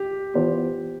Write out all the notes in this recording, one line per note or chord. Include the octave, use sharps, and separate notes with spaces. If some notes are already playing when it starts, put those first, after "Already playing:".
Already playing: G4
E3 B3 F4 G4 C5